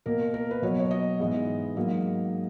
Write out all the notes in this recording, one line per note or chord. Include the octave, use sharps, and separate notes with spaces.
B2 A#3 A#4
A#4
B4
B2 F#3 B3 C#5
C#5
D#5
G#2 E3 B3
G#2 F#3 A#3